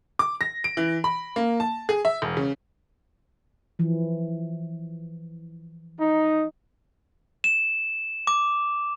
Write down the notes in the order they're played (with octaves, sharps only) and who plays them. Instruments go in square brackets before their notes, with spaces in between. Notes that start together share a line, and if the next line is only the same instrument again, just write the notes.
[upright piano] D6
A#6
D7
E3
B5
A#3
A5
G#4
E5
E1
C#3
[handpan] E3 F3
[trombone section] D#4
[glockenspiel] E7
D6